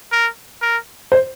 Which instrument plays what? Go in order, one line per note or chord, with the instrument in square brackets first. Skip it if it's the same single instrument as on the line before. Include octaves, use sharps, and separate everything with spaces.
[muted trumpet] A#4
A#4
[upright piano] C5